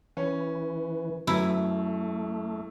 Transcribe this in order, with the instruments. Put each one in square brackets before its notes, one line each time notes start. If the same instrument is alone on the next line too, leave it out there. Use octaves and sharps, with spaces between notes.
[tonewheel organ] E3 [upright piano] C#4
[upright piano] F#2 [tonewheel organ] A3 [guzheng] E4